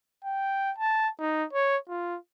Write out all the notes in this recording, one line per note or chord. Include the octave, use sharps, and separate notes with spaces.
G5
A5
D#4
C#5
F4